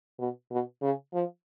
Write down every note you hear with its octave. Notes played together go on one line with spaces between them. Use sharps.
B2
B2
C#3
F3